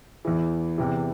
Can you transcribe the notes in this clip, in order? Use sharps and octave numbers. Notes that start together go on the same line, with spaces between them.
E2 E3
E2 C3 E3